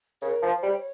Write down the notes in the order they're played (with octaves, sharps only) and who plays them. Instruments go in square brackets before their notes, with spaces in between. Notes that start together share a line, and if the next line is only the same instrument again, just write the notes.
[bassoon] C#3 [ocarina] A#4
[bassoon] F3
[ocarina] C5
[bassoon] G3
[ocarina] C#5